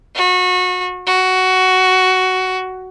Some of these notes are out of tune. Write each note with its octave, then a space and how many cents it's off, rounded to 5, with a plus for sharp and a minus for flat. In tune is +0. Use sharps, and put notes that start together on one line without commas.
F#4 -25
F#4 +10